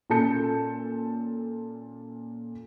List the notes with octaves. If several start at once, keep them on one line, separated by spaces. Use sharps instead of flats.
A#2 C#4 A4 A5 G6 C#7